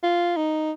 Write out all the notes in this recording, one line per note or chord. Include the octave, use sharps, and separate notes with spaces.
F4
D#4